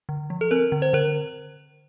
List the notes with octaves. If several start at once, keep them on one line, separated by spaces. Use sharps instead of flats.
D3
F3
A4
C4 A#4
D3
C5
D3 A#4